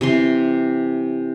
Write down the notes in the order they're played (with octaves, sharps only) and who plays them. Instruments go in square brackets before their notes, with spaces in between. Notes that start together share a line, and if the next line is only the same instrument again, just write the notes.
[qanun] C3 E3 C6